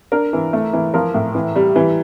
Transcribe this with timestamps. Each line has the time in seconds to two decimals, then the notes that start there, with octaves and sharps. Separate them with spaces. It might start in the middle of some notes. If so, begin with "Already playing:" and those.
0.12 D4 A#4
0.33 E3
0.53 A3
0.73 E3
0.94 F3 A#4
1.14 A2
1.35 E3
1.56 G3
1.76 E3